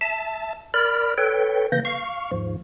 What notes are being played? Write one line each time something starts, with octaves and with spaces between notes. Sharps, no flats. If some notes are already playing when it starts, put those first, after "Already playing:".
E5 A5
A#4 D5 B5 F6
A4 B4 C#5 G5
C#3 E3 A#3 G6 A#6
F5 C#6
D#2 G#2 F3